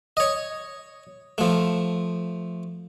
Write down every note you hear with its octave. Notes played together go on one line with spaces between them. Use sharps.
C#5 D#5
F3 A3